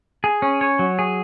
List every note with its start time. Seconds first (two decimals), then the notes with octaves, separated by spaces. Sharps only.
0.24 G#4
0.42 C#4
0.61 C#5
0.79 F#3
0.99 G#4